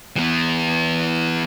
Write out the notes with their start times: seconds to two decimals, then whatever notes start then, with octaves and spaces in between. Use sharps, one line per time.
0.16 E3 B3